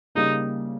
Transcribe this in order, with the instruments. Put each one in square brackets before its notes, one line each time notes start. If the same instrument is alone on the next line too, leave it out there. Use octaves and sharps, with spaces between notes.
[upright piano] C#3 G3 A#3 [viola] D#4